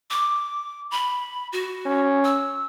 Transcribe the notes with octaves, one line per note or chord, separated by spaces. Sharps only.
D6
B5
F#4
C#4
E6